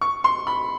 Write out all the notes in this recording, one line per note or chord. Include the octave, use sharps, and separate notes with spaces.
C#6
C6
B5